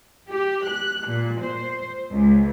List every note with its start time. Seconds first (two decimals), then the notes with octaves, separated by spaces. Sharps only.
0.29 G4
0.65 F#6
1.07 A#2
1.41 C5
2.11 C#2